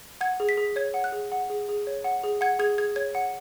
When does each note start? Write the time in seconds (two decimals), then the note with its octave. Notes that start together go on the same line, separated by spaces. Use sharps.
0.21 F#5 G#6
0.40 G#4
0.49 B6
0.57 G#4
0.76 C#5 G#6
0.94 F#5
1.04 F#6
1.12 G#4
1.32 F#5
1.50 G#4
1.69 G#4
1.87 C#5
2.04 F#5
2.23 G#4
2.41 F#5 G#6
2.59 G#4 G#6
2.78 G#4 G#6
2.96 C#5 G#6
3.15 F#5